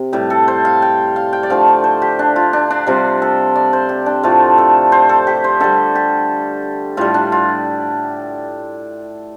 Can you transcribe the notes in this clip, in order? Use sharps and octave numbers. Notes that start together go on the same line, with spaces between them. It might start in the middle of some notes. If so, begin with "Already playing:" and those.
Already playing: C3
A2 G3 G4
A4
C5
F5
G5
F5
G5
D5
D3 F3 A3 F5
D5
C5
G4
D4
F4
D4
D4
C3 G3 F4
A4
D5
C5
G4
D4
A2 F3 A3 F4
A4
C5
A4
G4
C5
D3 G3 A4
G4
A2 G3 F4
D4
F4